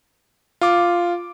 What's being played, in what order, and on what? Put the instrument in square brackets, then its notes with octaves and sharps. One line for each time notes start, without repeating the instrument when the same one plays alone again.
[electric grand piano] F4 D6